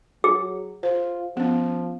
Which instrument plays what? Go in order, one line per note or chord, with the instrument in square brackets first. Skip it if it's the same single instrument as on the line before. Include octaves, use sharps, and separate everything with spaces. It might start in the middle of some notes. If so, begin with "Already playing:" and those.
[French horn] F#3 [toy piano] G#4
[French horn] F4 [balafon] C5
[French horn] F3 [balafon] B3 C#4